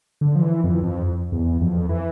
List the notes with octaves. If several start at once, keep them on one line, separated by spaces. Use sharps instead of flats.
D3
F3
E3
F2
F2
E2
F2
E3